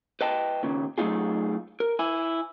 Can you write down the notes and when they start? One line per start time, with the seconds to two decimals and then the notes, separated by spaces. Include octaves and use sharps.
0.21 B4 D#5 G5 A5
0.63 D#2 A#2 C#3
0.98 F#3 A3 B3 D#4 F4 G#4
1.80 A#4
1.99 E4 G#5